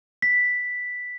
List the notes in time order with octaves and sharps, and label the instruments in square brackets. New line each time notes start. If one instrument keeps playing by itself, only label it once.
[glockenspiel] B6